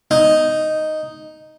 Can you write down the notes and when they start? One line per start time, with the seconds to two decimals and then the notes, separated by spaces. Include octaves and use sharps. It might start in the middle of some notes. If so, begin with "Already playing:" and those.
0.11 D#4